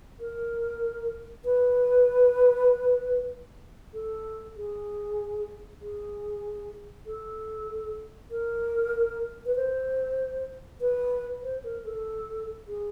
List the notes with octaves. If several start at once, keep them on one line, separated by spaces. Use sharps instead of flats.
A#4
B4
A4
G#4
G#4
A4
A#4
B4
C5
B4
C5
A#4
A4
G#4